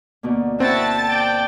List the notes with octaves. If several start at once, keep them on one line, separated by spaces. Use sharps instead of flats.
D2 B2 A#3
C4 E4 F#4 A5 A6
D5 G5